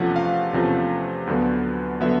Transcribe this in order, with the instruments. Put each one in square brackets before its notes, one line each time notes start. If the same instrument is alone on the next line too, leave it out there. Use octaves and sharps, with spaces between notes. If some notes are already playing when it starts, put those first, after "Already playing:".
Already playing: [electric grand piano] E2 C3 F3 A3 C#4 F#5
F5
E2 C3 F3 A3 C#4
D2 D3 F#3 B3
D3 F#3 B3 E5